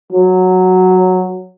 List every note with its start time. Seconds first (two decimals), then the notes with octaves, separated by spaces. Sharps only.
0.12 F#3